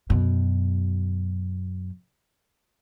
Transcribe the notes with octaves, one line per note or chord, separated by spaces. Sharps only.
F#2 B2